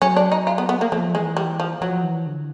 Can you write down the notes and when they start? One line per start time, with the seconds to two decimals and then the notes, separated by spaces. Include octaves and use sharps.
0.02 F#3 C#4
0.17 D4
0.32 D#4
0.47 F4
0.58 B3
0.69 B3
0.81 A#3
0.92 F3 A3
1.14 E3 G#3
1.37 G3
1.60 F3
1.81 F3 F#3
2.04 E3
2.26 D3